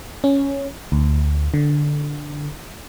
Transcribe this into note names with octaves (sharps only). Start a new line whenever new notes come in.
C#4
D2
D3